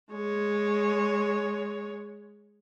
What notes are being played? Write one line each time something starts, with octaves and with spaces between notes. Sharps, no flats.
G#3 C#5